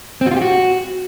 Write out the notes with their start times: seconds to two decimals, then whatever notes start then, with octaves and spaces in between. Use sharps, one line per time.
0.21 C4
0.26 F#4
0.31 F4
0.37 G4
0.42 F#4